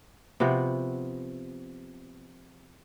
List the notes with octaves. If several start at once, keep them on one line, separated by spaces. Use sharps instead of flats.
C3 F3 B3 F#4